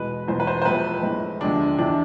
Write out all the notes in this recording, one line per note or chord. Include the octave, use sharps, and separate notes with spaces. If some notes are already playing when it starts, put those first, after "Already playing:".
Already playing: E2 B2 G#3 B4
E2 B2 G#3 C5
B4
C5
C5
F2 C3 F3 G#3 B4
A2 G#3
D2 C3 F3 G#3 D4
E2 C3 E3 D4